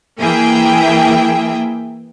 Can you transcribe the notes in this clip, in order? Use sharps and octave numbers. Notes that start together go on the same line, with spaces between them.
E3 A#3 G#4 E5 G5